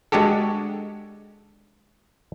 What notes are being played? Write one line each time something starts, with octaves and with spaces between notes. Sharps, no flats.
G#3 D4 F#4 G4 A4